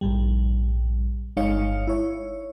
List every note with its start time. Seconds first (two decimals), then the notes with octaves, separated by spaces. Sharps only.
0.01 A#1 G#2 G3
1.37 G1 G#3 D#4 C#5 F5 C#7
1.87 E4 C#5